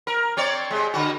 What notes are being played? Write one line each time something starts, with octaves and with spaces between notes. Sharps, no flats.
A#4
C4 C#5 D5
C3 G#3
D3 F#4